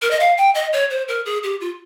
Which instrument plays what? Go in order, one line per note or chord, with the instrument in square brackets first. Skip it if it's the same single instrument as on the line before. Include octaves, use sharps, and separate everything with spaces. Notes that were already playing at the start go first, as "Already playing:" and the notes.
[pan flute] A#4
D#5
F5
G5
D#5
C#5
C5
A#4
G#4
G4
F4